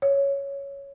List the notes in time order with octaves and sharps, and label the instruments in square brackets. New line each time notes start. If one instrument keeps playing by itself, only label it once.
[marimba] C#5